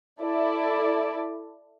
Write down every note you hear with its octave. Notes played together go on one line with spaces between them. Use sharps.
E4 A4 D5